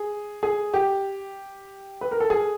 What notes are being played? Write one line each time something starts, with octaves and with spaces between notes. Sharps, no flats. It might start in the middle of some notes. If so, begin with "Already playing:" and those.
Already playing: G#4
G#4
G4
B4
A#4
A4
G#4